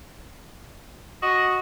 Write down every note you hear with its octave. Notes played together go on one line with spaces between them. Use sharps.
F#4 D#5